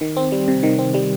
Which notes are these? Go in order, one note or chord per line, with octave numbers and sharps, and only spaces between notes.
D#3
C4
G3
C3
D#3
C4
G3